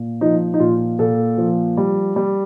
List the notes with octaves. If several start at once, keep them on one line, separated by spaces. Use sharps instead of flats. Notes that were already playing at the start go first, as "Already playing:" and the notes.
Already playing: A#2
F3 D#4
D#4
A#2 F4
A#2 A4
F3
G3
G3